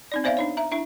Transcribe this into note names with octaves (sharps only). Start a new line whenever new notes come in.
C4 D#4 D5
B3 C5 D5 E5 F5
D4 D#4 C#5
E5 A#5
D4 E4 E5